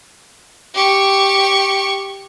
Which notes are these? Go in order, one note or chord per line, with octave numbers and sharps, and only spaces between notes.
G4 C#6